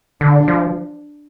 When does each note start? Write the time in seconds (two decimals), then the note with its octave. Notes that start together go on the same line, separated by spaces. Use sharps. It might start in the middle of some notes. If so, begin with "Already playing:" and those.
0.21 D3 D4
0.48 F3